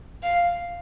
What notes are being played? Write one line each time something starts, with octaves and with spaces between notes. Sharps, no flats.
F5